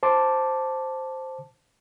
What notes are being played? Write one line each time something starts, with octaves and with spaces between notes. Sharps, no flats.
C5 A5 D6